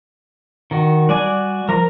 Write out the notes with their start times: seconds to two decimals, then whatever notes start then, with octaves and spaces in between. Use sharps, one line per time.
0.71 D#3 F#4
1.09 G3 F#4 D5 G#5
1.69 F3 A#4 A#5